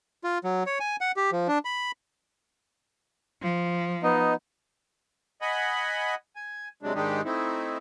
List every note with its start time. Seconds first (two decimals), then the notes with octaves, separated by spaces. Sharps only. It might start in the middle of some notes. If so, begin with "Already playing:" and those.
0.24 F4
0.44 F#3
0.66 C#5
0.80 G#5
1.01 F#5
1.17 G4
1.32 F3
1.48 D4
1.65 B5
3.43 F3
4.03 B3 D#4 D#5
5.42 D#5 F#5 G#5 B5
6.36 G#5
6.83 C3 F#3 G#3 D4
6.95 G#2 D#3 G#3 D4 D#4 G4
7.25 A3 C4 D#4 E4